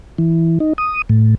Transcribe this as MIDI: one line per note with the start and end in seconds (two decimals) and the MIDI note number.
0.18 0.59 52
0.60 0.73 63
0.78 1.02 87
1.09 1.35 45